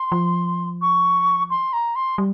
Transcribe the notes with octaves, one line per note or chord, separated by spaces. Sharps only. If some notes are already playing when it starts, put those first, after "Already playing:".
Already playing: C6
F3
C#6
C6
A#5
C6
G3